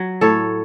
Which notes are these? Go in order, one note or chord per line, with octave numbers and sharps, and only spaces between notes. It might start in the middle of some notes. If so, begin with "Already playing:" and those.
Already playing: F#3
A2 A4 C#5